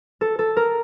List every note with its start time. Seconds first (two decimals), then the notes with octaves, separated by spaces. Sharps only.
0.21 A4
0.39 A4
0.56 A#4